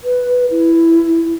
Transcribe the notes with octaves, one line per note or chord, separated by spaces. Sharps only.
B4
E4